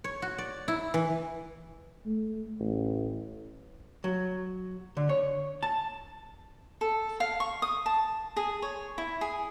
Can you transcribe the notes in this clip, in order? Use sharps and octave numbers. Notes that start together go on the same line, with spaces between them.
C#5
F#4
D5
E4
E3
A3
A1
F#3
D3
C#5
A5
A4
F5
C#6
D#6
A5
G#4
C#5
E4
G#4